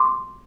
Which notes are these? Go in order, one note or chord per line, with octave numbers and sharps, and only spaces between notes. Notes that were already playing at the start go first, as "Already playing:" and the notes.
Already playing: C6 D6